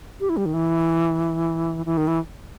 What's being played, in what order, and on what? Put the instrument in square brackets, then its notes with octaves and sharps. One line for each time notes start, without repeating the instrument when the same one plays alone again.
[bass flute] G4
E4
G3
D#3
E3
E3
D#3
E3